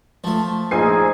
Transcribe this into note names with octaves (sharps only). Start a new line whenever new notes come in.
F3 A3 C#6
A#1 D#4 G#4 C5 G#5 C7